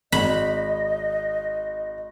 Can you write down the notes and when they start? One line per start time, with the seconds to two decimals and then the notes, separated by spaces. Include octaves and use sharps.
0.12 G#1 D#5 B5